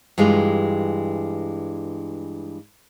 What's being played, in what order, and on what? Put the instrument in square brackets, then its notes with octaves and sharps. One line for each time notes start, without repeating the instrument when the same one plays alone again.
[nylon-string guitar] G2 E3 G#3 F4 G4